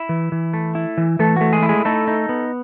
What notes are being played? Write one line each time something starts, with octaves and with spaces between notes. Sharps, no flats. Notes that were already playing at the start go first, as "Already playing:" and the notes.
Already playing: E4 E5
E3
E3
A3
E4
E3
E3 A3 A4
A3 F#4
G#3 G#4
E4
G#3 G#4
A3 D#4 A4
D#4
B3